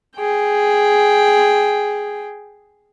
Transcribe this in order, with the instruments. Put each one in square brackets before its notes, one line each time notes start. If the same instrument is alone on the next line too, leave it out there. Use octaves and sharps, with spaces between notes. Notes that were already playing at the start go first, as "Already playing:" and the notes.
[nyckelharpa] G#4 G5